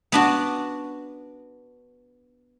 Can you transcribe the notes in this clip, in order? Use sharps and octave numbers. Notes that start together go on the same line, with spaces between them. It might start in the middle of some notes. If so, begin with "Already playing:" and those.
B3 D4 F#4